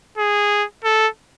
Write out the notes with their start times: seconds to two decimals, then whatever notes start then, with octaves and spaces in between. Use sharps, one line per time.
0.18 G#4
0.84 A4